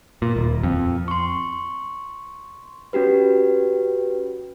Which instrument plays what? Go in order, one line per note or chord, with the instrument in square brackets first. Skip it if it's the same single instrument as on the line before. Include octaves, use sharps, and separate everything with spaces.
[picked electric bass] A#2
D#1
F2
[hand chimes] C6 C#6
C#4 F#4 G4 B4